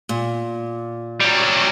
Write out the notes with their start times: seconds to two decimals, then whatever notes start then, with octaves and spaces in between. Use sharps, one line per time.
0.09 A#2
1.20 F#3 G3